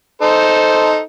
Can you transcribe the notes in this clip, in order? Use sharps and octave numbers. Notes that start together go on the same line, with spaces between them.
D#4 A4 C5